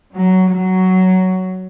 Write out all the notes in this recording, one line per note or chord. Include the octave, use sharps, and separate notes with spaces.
F#3
F#3